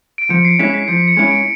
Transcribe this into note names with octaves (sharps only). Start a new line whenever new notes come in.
D7
F3 C#7
C7
G#3 C#4 E4 B6
B6
F3 C#7
C#7
G#3 C#4 E4
D7